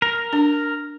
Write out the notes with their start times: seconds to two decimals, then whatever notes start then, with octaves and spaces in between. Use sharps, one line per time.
0.02 A#4
0.33 D4